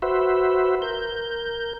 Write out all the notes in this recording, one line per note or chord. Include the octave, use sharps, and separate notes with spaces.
F#4 B4 C5 E5
A#4 G6